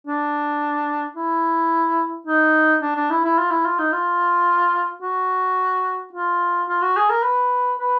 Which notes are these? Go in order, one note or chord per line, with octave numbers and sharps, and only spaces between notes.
D4
E4
D#4
D4
D4
E4
E4
F4
E4
F4
D#4
F4
F#4
F4
F4
F#4
G#4
A#4
B4
B4